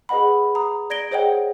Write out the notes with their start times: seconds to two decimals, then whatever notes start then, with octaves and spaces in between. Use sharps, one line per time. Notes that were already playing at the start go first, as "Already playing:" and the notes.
0.09 G#4 B4 D#5 F#5 B5
0.55 A#5 D#6
0.90 D5 G#6 A#6 D7 G7
1.11 G#4 C5 C#5 D#5 F#5 G5